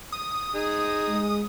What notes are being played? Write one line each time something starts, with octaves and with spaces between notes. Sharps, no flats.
D#6
D#4 G#4
G#3